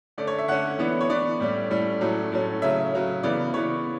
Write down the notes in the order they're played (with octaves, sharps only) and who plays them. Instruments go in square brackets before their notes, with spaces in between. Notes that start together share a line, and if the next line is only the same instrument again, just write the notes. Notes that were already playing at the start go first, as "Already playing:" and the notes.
[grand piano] D3 A3 C#4 D5
C#5
E5
D3 A3 C#4 F#5
E3 B3 D4
C#5
E3 B3 D4 D5
A2 G3 C#4
A2 G3 C#4
A2 F#3 A3 C#4
A2 F#3 A3 C#4
C#3 F#3 C#4 E5
C#3 F#3 C#4
C#3 E3 B3 D5
C#3 E3 B3 C#5